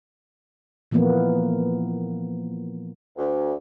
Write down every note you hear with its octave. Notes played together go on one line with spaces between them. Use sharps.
A#2 E3 F3 A#3 B3
D2